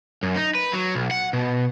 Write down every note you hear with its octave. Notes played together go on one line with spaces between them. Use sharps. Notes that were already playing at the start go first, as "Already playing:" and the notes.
F#2
D#4
B4
F#3
B1
F#5
B2